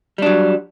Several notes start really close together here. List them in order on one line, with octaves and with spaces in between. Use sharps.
G3 D4 F#3